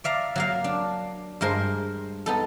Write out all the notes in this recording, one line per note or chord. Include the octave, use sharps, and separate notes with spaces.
D5 E5 F5 A#5
F#3 A#3 F5
D4
G2 G#3 A#4 C5
B3 D#4 A4